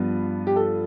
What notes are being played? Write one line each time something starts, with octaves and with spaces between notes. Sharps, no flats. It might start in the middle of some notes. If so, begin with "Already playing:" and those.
Already playing: G2 F3 B3
G4
A4